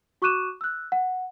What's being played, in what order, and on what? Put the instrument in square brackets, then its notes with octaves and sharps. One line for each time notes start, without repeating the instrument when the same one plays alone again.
[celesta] F#4 C#6 D6 F#6 D#7 E7
E6 F#6
F#5